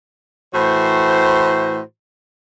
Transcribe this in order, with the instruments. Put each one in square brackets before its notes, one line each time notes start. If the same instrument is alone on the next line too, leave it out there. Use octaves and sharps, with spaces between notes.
[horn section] A2 E3 F#4 C5